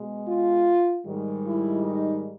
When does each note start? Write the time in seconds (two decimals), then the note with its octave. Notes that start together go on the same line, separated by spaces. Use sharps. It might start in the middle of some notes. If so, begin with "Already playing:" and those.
Already playing: B2 G#3
0.28 F4
1.06 G#2 D#3 G3
1.45 E4
1.84 D#4